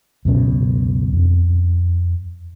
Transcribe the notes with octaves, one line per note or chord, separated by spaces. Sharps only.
C#2 F#2 B2 C#4
F2